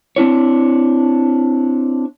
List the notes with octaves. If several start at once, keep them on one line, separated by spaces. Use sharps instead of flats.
C4 D4 E4 C#5